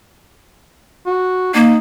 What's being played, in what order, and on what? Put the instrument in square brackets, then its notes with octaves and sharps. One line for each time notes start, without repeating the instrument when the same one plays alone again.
[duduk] F#4
[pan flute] A#3 [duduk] D#4